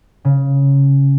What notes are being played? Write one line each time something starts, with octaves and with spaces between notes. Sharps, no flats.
C#3